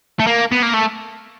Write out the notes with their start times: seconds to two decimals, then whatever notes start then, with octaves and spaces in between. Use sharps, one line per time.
0.20 A3
0.27 A#3
0.52 B3
0.63 A#3
0.74 A3